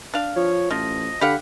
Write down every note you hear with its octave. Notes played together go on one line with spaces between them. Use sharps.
D4 F5
F3 C#5
A1 F3 D#5
D3 G4 F5 F#5 B5